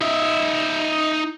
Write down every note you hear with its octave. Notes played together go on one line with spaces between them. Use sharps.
D#4 E5